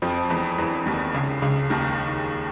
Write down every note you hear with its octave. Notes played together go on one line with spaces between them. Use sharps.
F2 F3
E2 E3
E2 E3
D#2 D#3
C#2 C#3
C#2 C#3
D#2 D#3